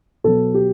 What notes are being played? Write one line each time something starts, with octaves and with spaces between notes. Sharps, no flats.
B2 F#3 B3 A4
G4